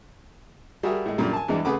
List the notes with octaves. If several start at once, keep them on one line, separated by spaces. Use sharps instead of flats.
G3 F#4 G#4 A#4 E5
A2 G#3
F#2 A#2 D3 G3
G#5 A5
E2 G2 E3 G#3 D4
C#3 A3 G#4 B4 F#5 D6